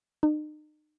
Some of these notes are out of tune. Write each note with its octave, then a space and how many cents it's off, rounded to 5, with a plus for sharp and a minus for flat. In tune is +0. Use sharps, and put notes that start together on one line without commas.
D#4 -40